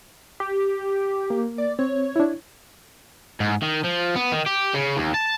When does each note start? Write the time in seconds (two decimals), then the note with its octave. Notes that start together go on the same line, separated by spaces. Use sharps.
0.40 G4
1.30 A#3
1.58 D5
1.79 C4 C#5
2.16 D4 E4
3.40 G#2
3.63 D#3
3.85 F3
4.16 B3
4.32 D#3
4.46 G4
4.74 C#3
4.97 D#2
5.14 A5